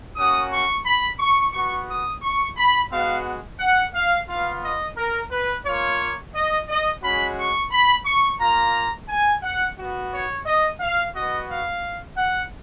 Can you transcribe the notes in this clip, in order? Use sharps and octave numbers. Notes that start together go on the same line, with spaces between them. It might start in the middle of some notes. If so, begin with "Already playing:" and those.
A#3 C#4 F#4 D#6
C#6
B5
C#6
B3 F#4 C#6
D#6
C#6
B5
G#3 B3 F#4 F5
F#5
F5
B3 F4 F5
D#5
A#4
B4
A#3 F4 C#5
D#5
D#5
G#3 C#4 F#4 B5
C#6
B5
C#6
A#3 F4 A#5
G#5
F#5
B3 F#4
C#5
D#5
F5
B3 F#4 D#5
F5
F#5